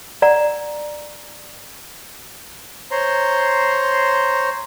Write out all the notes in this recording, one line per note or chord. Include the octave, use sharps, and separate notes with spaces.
D5 F#5 A#5
C5 C#5 A#5 C6